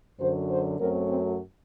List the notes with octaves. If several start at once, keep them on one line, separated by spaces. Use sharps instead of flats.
F#2 D3 F#3 C5
C5
F#2 F#3 A3 C4 A#4
C4